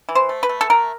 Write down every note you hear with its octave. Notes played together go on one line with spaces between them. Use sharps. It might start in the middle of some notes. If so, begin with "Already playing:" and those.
E3
C5
A3
B4
A3
A4
A3 A#4